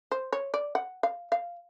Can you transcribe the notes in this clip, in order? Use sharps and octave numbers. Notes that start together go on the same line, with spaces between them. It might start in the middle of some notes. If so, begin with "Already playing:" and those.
C5
C#5
D5
F#5
F5
F5